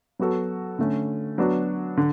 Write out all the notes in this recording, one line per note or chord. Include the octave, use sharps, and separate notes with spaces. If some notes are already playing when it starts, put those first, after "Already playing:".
F#3 B3 F#4 A4
D3 A3 C#4
F#3 B3 D4 F#4
D3